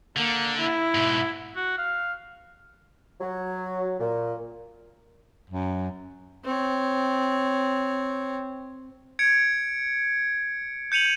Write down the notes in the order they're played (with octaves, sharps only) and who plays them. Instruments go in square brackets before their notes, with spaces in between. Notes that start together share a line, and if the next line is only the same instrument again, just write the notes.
[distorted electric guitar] D3 [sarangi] A#3
[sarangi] E4
[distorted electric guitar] G#2 B2
[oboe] F#4
F5
[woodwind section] F#3
A#2
[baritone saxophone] F#2
[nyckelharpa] C4 C#5
[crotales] G#6 C#7 D7
G6 C#7 D#7 F7 F#7